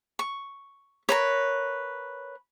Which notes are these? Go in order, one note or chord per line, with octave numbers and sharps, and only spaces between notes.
C#6
A#4 B4 C#5